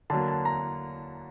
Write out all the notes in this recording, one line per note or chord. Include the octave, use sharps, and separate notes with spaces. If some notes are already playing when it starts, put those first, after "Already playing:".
D3 F#3 A#3 A5
A5
A#5